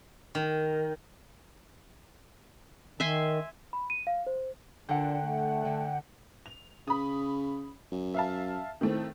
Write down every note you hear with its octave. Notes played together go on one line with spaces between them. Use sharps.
D#3
D#3 E5 G#5 C6
B5
D#7
F5
C5
A#2 D3 D4 F#5 G5
A3
D3
F7
C#3 B5 D#6
F#2
E5 F5 A5
A2 D#3 A3 C4